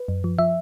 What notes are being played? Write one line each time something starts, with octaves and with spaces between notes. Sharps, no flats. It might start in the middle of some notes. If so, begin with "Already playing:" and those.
Already playing: B4
F#2
F3
F3 E5